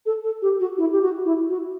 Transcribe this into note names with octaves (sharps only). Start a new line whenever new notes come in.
A4
A4
G4
F#4
E4
G4
F#4
E4
F#4